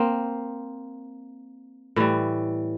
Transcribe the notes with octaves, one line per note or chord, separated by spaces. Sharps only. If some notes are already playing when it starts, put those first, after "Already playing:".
Already playing: A#3 C4
A2 E3 G3